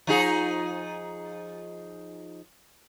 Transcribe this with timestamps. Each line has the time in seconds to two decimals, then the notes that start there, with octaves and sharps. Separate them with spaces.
0.07 F3 D#4 G#4